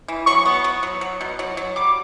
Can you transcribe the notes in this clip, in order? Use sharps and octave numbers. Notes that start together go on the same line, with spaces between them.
E3
F#3 C#6
B3
F#3
F#3
F#3
B2
F#3
F#3
G3 D6